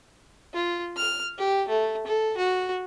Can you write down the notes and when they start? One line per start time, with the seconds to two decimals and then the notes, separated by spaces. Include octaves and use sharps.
0.53 F4
0.96 F6
1.38 G4
1.69 A3
2.07 A4
2.37 F#4